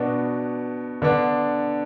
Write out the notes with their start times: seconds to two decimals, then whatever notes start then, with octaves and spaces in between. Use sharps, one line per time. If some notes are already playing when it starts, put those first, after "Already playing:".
Already playing: B2 B3 D4 F#4
1.02 D3 B3 D4